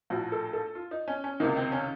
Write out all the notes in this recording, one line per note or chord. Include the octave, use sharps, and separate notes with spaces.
A#1 A2 F3 F#4
A4
A4
F4
D#4
C#4
C#4
C#2 C3 D#3 A#3
C4
C#4